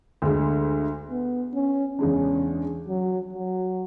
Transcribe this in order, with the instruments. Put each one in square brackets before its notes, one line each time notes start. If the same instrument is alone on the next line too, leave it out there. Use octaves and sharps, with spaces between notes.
[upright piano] D2 D3 G#3
[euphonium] B3
C#4
[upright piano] E2 C#3 G#3 D4 [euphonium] C#4
[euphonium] F#3
F#3